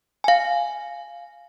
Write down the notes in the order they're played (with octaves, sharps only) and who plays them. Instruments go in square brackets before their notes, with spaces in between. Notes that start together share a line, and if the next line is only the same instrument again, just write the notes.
[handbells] F5 G#5